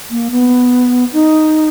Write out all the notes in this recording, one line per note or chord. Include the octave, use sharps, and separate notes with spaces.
A#3
B3
D#4